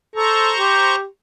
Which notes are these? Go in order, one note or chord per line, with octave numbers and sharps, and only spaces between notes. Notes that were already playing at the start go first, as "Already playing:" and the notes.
A4 C5 A#5 C#6
G4